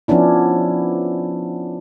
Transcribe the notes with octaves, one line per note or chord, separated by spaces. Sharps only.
F3 B3 C#4 D4 E4